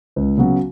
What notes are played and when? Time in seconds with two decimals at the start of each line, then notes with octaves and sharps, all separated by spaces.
0.16 C#2
0.37 C#3 F#3 B3 F#4